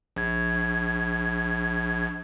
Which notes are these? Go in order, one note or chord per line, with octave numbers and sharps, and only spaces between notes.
A#1 G#6